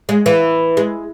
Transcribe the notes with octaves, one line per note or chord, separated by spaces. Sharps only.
G#3
E3
G#3